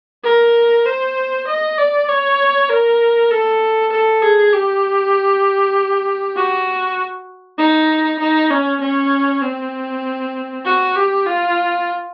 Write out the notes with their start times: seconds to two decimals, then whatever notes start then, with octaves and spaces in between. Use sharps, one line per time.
0.23 A#4
0.86 C5
1.47 D#5
1.77 D5
2.08 C#5
2.69 A#4
3.30 A4
3.91 A4
4.22 G#4
4.52 G4
6.36 F#4
7.58 D#4
8.19 D#4
8.51 C#4
8.81 C#4
9.42 C4
10.65 F#4
10.95 G4
11.26 F4